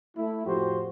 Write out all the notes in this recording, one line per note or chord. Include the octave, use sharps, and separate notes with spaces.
A3 E4
F2 A2 F3 F#4 G4 C5